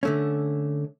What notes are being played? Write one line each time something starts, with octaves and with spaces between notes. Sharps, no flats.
D3 A3 C#4